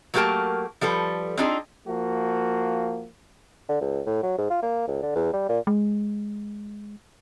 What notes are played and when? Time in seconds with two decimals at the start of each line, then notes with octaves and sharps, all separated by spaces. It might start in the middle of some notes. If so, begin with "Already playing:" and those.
0.14 F#3 A3 A#3 G4 A#4 A5
0.81 F3 G3 A4 B4
1.37 C4 D4 D#4 F4 F#4 G#4
1.87 F3 A#3 F#4
3.69 D3
3.81 C#2
4.06 A2
4.23 F#3
4.38 G#2
4.50 F4
4.62 A#3
4.88 C#2
5.02 D3
5.15 E2
5.33 G3
5.49 A#2
5.67 G#3